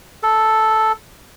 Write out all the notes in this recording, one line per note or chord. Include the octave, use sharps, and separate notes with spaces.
A4